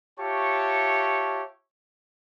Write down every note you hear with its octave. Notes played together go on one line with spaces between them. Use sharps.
F4 G4 C#5 E5 A5 C#6